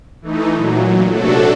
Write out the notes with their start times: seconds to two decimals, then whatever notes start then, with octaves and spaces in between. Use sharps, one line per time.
0.22 E3 A3 D#4
0.53 A#2 F#3
1.09 C3 F#3 A3 D4 F#4 A4